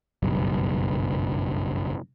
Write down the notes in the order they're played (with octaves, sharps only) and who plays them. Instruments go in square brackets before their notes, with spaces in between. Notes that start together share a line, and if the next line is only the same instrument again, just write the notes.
[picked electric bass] F#1 B1 G2